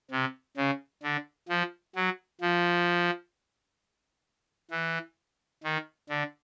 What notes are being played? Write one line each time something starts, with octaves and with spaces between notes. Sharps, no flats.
C3
C#3
D3
F3
F#3
F3
E3
D#3
D3